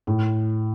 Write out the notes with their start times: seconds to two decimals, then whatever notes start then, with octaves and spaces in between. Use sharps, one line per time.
0.07 A2